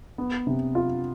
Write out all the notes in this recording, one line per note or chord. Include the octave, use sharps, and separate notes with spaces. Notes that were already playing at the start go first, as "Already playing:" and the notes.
B3
C3
F4